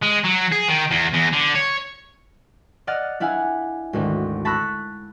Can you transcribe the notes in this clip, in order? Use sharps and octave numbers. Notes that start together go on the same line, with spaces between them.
G#3
F#3
G#4
D#3
E2
E2
D3
C#5
D5 D#5 F#5 F6 A6
D4 E4 F5 F#5 G#5
G#1 D2 D4
A5 B5 C#6 E6 F#6 A#6